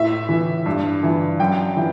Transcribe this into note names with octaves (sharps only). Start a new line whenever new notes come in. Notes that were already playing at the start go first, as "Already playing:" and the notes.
Already playing: A2 E5
E3
G2
E3
F#2 G5
E3